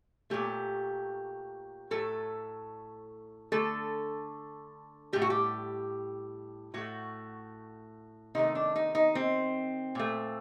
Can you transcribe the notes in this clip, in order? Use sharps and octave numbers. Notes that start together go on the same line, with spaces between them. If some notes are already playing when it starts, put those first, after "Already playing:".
A#2 F#3 A3 G4
A2 F#3 A3 A4
D3 A3 A4
A2 G3 G4
F#4
G4
A2 A3 F#4
C3 D#3 A3 D#4
D4
D#4
D#4
C4
A#2 A3